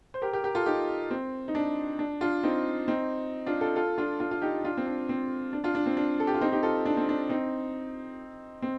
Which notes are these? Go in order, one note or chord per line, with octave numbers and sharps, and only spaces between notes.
C5
G4 A#4
G4 A#4
G4 A#4
F4 A4
D#4 G4
C4
D#4
D4
D4
D4 F4
C4 D#4
C4 D#4
D4 F4
F4 A4
F4 A4
D4 F4
D4 F4
F4
D#4 G4
D4 F4
C4
D4
C4
D4
D4 F4
D4
C4
D4
A4
G4
F4
C4 D#4
D#4 G4
F4 A4
D4
C4
D4
C4 D#4
C4